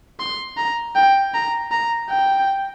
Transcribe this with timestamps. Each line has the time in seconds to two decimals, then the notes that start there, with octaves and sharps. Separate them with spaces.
0.20 C6
0.57 A#5
0.96 G5
1.34 A#5
1.72 A#5
2.10 G5